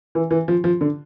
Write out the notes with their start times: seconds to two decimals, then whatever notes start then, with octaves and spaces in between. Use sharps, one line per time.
0.15 E3
0.31 E3
0.48 F3
0.64 F3
0.81 D3